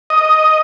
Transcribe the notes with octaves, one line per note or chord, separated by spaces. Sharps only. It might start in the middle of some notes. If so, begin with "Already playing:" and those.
D#5